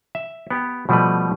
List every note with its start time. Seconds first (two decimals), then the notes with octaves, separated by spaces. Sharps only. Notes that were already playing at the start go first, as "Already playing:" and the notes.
0.15 E5
0.50 B3 G4
0.89 B2 F3 G3 A3 B4